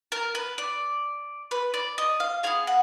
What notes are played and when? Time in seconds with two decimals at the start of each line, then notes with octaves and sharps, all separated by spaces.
0.12 A#4
0.35 B4
0.58 D5
1.51 B4
1.74 D5
1.98 D#5
2.20 F5
2.43 B3 F4 G#4 F5
2.67 F#5